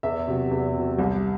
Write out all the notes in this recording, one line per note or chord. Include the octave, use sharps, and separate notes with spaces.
E2 E5
C3 F#3
E2
C3 F#3
C2